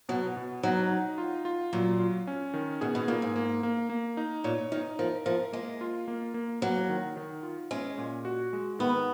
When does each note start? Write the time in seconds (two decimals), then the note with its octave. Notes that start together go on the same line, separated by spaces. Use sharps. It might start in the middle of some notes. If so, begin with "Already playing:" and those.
0.09 B2 F#3
0.37 B2
0.63 F#3 D#4
0.91 D#4
1.18 F4
1.45 F4
1.73 A#2 F#3
2.00 F4
2.27 C#4
2.54 D#3
2.81 B2 G#4
2.95 B2
3.08 A#2 A#3
3.22 G#2
3.36 A#3
3.63 A#3
3.90 A#3
4.17 D#4
4.44 A#2 C#5
4.72 D#3 D#4
4.99 F3 A#4
5.26 F3 A#4
5.53 G#3 A#3
5.81 F4
6.08 A#3
6.34 A#3
6.61 F#3 A#3
6.89 D#3
7.17 D#3
7.43 F4
7.71 G#3 C#4
7.98 A#2
8.25 F#4
8.53 G#3
8.79 D#3 B3